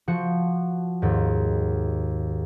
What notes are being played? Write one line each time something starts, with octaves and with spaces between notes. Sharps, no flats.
F3 F#4 C#7
D#2 G#2